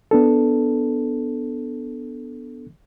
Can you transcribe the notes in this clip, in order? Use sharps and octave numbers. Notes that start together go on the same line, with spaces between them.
B3 D4 A4